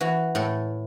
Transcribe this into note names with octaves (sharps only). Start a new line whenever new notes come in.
E3 F#4
A2 A4